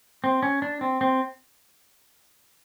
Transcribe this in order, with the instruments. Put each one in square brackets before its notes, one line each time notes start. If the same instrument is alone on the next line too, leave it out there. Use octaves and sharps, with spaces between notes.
[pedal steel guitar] C4
C#4
D4
C4
C4